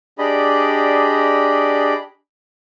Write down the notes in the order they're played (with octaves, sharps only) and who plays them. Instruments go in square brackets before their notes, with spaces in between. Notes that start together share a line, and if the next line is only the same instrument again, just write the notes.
[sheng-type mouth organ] D4 G4 G#4 D5 D#5 B5